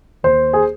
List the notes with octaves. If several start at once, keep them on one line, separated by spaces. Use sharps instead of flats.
D#2 C5
G#4